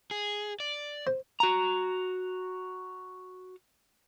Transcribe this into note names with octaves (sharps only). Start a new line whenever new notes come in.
G#4
D5
C5
F#4 A#5